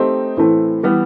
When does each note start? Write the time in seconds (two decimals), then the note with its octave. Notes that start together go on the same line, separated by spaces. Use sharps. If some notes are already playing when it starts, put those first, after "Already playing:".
Already playing: A3 C4 D#4 G4
0.37 A2 E3 A3 C4
0.83 E3 G3 B3